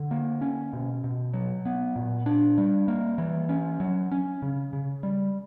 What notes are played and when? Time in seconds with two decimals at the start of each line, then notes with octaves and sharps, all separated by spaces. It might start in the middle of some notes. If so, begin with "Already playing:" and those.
Already playing: D3
0.11 A#3
0.41 C#4
0.73 B2
1.04 B2
1.34 F#3
1.65 B3
1.96 A#2
2.26 D4
2.58 G3
2.88 A#3
3.18 E3
3.49 C#4
3.80 F#3
4.12 C#4
4.42 C#3
4.73 C#3
5.03 G3